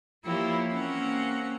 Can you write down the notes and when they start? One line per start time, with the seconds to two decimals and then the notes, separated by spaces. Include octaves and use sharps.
0.24 E3 F3 A#3 E4 G4 C#5
0.73 A#3 C4 C#4 F#5